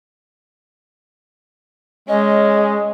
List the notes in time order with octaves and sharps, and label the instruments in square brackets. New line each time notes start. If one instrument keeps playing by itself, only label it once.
[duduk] G#3 [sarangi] C#4 [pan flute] D#5